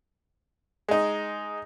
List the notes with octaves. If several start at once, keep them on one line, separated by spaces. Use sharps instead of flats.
G#3 D#4